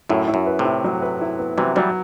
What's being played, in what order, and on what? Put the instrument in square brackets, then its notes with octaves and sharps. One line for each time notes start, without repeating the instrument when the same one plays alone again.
[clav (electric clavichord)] F#2 A2 [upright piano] E4
[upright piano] E4
[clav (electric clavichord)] F#2
[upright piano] B4
[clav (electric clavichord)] A2 C3
[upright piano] E4
F#3
B4
E4
B3
[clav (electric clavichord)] C3 E3 [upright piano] F#3
[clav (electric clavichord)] E3 G3 [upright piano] F#3